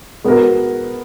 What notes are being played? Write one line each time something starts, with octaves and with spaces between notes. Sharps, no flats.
G#3 B3 F#4 A#4